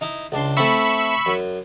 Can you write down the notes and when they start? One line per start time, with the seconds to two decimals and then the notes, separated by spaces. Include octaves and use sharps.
0.01 D#4 E4
0.32 C#2 D4 C6
0.57 A3 C4 E4 B5 C#6 E6
1.26 F#2